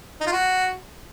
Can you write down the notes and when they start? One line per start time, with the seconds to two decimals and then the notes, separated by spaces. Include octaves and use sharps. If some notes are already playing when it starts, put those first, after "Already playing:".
0.21 D#4
0.26 F4
0.32 F#4